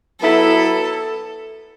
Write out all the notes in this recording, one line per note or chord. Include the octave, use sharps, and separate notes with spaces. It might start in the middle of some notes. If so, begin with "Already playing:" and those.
F#3 B3 E4 A4